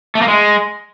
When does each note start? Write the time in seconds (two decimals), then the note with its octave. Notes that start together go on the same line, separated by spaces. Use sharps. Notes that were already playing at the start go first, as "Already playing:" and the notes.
0.15 A3
0.22 A#3
0.28 G#3